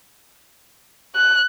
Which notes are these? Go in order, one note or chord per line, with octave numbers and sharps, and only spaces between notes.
F#6